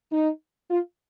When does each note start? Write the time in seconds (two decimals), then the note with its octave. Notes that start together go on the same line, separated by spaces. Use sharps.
0.12 D#4
0.70 F4